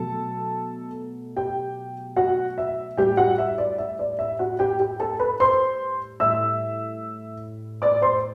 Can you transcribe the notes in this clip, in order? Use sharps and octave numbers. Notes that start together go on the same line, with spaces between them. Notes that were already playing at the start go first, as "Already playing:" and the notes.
Already playing: B2 F#3 A3 A4 A5
G4 G5
F#4 F#5
E5
A2 G3 G4 G5
F#4 F#5
E5
D5
E5
D5
E5
F#4 F#5
G4 G5
G4 G5
A4 A5
B4 B5
C5 C6
A2 G3 E5 E6
D5 D6
C5 C6